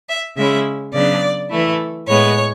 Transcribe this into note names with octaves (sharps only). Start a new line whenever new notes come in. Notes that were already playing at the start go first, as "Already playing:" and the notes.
E5
C#3 G#3 C#4 E4 E5
C#3 F#3 B3 D4 D5
E3 A3 E4
A2 G#3 B3 C#5